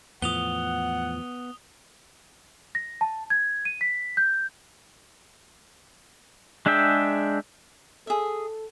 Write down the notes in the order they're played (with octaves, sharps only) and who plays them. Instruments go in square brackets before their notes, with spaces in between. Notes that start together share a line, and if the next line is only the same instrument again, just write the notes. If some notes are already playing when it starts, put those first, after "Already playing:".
[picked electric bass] E2 A2 F3 [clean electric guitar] B3 [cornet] F#5 [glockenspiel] D#6 F7 G7
[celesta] A#6
A5
G#6
D#7
B6
G6
[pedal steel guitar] G#3 D4 G#4 E5 G5
[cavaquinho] G#4 E5 [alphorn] A4